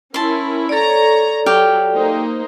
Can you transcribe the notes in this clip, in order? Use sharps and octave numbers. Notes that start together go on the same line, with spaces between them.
C#4 E4 A#4 A5 C6
A4 C#5 D5 A#5
F#3 G4 F5 G5
A#3 D#4 C5